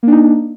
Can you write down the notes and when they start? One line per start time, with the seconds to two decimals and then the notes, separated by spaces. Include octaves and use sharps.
0.03 A#3
0.07 D4
0.12 D#4